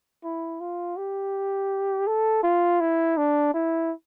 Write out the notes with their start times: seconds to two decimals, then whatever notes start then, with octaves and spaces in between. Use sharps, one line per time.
0.24 E4
0.61 F4
0.97 G4
2.07 A4
2.43 F4
2.80 E4
3.17 D4
3.54 E4